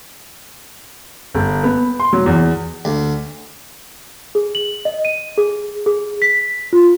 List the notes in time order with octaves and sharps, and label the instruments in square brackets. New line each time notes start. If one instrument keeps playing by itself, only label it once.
[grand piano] G1
B3
C6
F#3
E2
[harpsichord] D2
[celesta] G#4
F#7
D#5
D#7
G#4
G#4
B6
F4